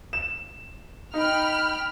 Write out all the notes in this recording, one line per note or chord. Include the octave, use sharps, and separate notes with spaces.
E7
D#4 G5 B5 F6